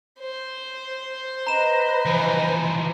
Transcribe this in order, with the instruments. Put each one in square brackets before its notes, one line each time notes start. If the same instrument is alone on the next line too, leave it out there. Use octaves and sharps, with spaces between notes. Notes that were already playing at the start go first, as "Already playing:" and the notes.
[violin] C5
[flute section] B4 D#5 B5 [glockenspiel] A#5 E7
[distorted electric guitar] E3 F3